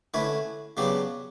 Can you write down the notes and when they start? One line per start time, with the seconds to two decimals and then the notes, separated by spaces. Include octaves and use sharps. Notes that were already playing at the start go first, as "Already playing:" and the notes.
0.14 D3 A3 C#4 E4 B4
0.77 C#3 F#3 B3 D4 G4